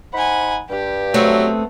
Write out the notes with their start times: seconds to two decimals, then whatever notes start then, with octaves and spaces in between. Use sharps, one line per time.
0.14 D#4 C5 F#5 G#5 B5
0.70 G2 G4
1.14 F#3 A3 B3 C4